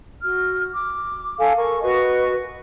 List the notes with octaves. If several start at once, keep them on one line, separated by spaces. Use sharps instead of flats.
F#4 F6
D6
A4 F5 G#5
A#4 C#6
F#4 B4 D#5 C#6